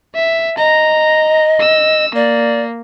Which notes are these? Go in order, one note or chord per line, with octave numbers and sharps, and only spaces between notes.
E5
D#5 A#5
E6
A#3 D5